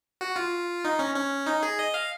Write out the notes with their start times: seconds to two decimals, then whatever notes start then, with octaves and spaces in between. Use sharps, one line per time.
0.21 F#4
0.36 F4
0.84 D#4
0.99 C#4
1.15 C#4
1.47 D#4
1.63 G#4
1.79 D#5
1.94 F5